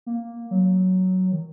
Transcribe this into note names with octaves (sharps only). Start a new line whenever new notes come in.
A#3
F#3
D#3